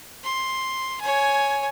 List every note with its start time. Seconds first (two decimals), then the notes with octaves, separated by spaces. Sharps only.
0.24 C6
1.01 C#5 G#5